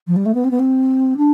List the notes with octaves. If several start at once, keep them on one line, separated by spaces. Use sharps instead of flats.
F3
G3
A3
B3
C4
B3
C4
D4